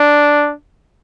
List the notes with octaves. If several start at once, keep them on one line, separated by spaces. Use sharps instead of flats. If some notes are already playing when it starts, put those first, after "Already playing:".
Already playing: D4